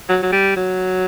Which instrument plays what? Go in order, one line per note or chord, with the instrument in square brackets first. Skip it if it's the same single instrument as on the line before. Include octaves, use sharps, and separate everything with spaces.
[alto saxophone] F#3
F#3
G3
F#3